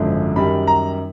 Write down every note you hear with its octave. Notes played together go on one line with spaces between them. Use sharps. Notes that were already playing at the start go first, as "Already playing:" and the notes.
Already playing: G#1 F#2 D3 F3 G#3
F#2 D#3 G3 B5
A#5